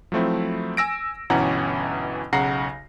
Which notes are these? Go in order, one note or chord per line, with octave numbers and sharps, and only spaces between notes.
F3 F#3 A3 C4 E4
G#5 E6 A#6 D7
G1 B2 E3 C#4 F#5 A#5
B1 C#3 F#5 A#5 A#6 C7